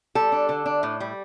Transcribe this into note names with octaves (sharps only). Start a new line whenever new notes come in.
G3 A4
D4
D3
D4
A2
G3